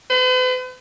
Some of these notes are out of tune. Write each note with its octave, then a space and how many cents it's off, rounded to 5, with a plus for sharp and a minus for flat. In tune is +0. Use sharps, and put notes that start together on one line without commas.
B4 +45